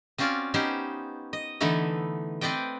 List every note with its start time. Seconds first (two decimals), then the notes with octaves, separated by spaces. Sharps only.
0.18 C4 C#4 F4 F#4 D5
0.54 B3 C#4 D#4 G4 C5
1.33 D#5
1.60 D3 E3 A3 B3 D#4 E4
2.41 C4 B4 D5 D#5 G5